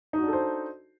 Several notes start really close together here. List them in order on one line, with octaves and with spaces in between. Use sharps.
D#4 F#4 D4 A4 C5